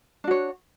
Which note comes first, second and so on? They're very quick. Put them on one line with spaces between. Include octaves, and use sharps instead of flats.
D4 F#4 C#5